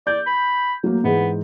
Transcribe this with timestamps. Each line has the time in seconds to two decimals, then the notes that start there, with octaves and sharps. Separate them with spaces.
0.07 D5 G6
0.26 B5
0.83 F#3 A3 A#3
1.04 G#2 E3 G#3 B3